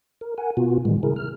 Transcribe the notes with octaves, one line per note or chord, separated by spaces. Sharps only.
A#4
A#4 F#5 G#5
B2 B3 F4 F#4
A2 D#3 E3 G3 G#3
C#3 E4 G#4 A#4
F6